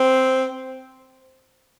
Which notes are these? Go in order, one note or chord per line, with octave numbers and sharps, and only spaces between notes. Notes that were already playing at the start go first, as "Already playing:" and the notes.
Already playing: C4